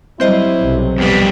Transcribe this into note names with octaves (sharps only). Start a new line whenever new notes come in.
F#3 G3 C4 E4 C5 D#5
B1 C3 F#3
F2 G3 B3